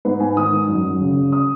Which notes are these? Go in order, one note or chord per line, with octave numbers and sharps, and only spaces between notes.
G#2 B4
G#2 G#5
D#3 D#6
D#3
F#2
F#2
C#3
C#3
D#6